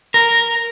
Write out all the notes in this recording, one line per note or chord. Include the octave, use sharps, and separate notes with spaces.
A#4